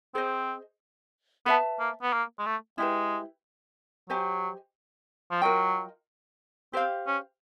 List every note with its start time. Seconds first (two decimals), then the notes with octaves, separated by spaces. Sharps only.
0.14 C4 G#4 C5 D#5
1.46 B3 B4 E5 A5
1.79 A#3
2.02 B3
2.13 A#3
2.39 G#3
2.46 A3
2.78 G#3 E4 G4 B4
4.10 F#3 G4 C5 D#5 G#5
5.31 F3
5.42 F#3 F4 A#4 D#5 G5
6.73 C4 G4 C5 F5
7.07 C#4